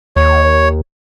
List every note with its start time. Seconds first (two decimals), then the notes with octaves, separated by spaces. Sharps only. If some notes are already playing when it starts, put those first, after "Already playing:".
0.16 D#2 C#5